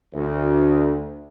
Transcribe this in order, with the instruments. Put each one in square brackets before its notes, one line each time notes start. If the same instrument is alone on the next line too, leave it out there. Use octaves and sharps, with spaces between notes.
[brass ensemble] D2